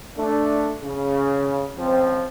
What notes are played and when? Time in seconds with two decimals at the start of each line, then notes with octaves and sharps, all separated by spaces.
0.18 A3 D4
0.82 C#3
1.78 C#2 F3 C4